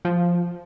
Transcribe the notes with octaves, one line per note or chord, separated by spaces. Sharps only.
F3